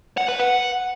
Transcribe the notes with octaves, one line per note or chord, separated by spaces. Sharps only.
F#5
B4
F#5